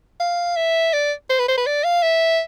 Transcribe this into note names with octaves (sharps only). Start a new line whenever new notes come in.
F5
E5
D5
C5
B4
C5
B4
D5
F5
E5